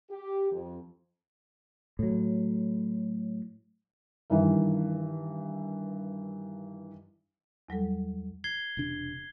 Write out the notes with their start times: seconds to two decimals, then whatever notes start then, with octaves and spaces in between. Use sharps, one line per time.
0.10 G4
0.52 F2
1.99 A2 F#3
4.30 G2 D#3 E3
7.68 E2 F#3 G3 A4
8.44 G#6 C7 G7
8.77 E1 C3 D4